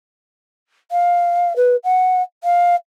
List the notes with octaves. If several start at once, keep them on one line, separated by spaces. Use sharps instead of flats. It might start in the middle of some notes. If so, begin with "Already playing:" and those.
F5
B4
F#5
F5